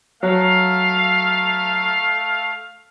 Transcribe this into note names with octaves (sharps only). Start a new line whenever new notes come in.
F#3 A3 F5